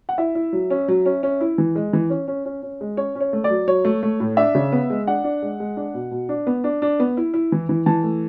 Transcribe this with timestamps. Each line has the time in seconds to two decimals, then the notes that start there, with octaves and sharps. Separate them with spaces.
0.09 F#5
0.18 E4 E5
0.35 E4
0.53 F#3
0.70 C#4
0.88 F#3
1.06 C#4
1.23 C#4
1.41 E4
1.58 E3
1.76 G#3
1.93 E3
2.10 C#4
2.28 C#4
2.45 C#4
2.63 C#4
2.81 G#3
2.97 C#4 C#5
3.15 C#4
3.21 C#5
3.33 A3
3.44 D5
3.50 F#3
3.67 F#3 C#5
3.85 A3
4.03 A3
4.20 A2
4.37 D4 E5
4.55 C#3
4.72 B3
4.90 G#3
5.07 D4 F#5
5.24 D4
5.42 G#3
5.60 G#3
5.77 D4
5.94 B2
6.11 B2
6.29 D4
6.47 B3
6.64 D4
6.82 D4
7.00 B3
7.17 E4
7.34 E4
7.52 E3
7.69 E3
7.86 E3 A5
8.03 A3